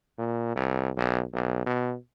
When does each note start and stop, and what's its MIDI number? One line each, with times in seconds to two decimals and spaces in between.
0.18 0.51 46
0.56 0.90 36
0.97 1.23 35
1.33 1.63 35
1.66 1.95 47